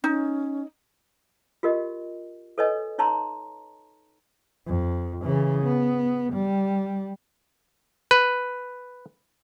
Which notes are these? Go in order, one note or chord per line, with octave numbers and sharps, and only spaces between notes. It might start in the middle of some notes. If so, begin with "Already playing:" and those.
C#4 D#4
F4 G4 A#4 D#5
A4 B4 C#5 D#5 G#5
D#4 C#5 A5 A#5 C6
F2
C#3 E3
B3
G3
B4